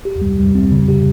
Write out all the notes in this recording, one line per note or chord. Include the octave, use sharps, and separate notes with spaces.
G4
G3
G3
C4
C#3
G4